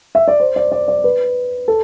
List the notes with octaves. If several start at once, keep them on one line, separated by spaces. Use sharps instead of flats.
E5
D5
C5
D5
D5
D5
B4
A4